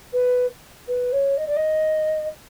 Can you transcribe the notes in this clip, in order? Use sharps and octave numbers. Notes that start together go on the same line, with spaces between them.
B4
B4
C#5
D#5
D5
D#5